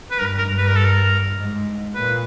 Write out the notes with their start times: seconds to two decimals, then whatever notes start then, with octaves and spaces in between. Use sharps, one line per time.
0.11 B4
0.18 G2 A#4
0.38 A#4
0.47 G2
0.58 B4
0.67 A#4
0.76 A4
0.85 A#4
1.36 G#2
1.95 A#2 B4